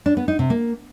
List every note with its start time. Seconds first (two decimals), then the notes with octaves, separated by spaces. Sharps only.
0.06 D4
0.17 B3
0.28 D#4
0.39 C3
0.50 A#3